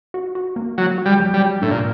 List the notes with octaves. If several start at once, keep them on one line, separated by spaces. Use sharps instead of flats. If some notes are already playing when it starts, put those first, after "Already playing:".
F#4
F#4
A#3
F#3 F#4
F#4
G3
F#3
G3
F#3
A2 D4
A#2